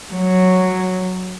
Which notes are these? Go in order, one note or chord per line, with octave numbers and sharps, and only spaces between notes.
F#3